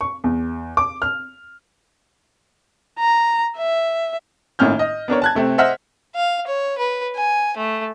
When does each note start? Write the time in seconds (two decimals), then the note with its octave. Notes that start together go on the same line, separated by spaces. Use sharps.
0.01 C#6
0.24 E2
0.77 D6
1.02 F6
2.99 A#5
3.57 E5
4.59 G#1 A2 A#3 C#4 F6 G6
4.79 D#5
5.08 B3 D4 A#4 C#5
5.22 A5 F#6 G#6
5.35 C3 A3 C4
5.58 C5 D#5 E5 F#5 F6 B6
6.16 F5
6.47 C#5
6.78 B4
7.15 G#5
7.57 A3